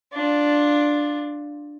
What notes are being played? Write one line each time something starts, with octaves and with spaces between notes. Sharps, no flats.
D4 F4